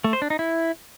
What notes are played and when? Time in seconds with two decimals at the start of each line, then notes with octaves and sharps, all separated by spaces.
0.04 A3
0.13 C5
0.22 D4
0.30 D#4
0.39 E4